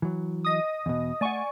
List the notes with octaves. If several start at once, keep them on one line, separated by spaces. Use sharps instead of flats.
E3 F#3
D#5 D#6
E2 B2
A3 D5 F#5 G#5 C#6